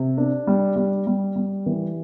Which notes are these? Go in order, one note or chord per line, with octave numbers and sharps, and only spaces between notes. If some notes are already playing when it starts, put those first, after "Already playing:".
Already playing: C3
D4
G3
G3
G3
G3
E3